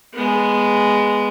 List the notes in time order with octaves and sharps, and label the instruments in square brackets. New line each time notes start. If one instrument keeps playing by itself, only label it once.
[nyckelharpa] G#3 B3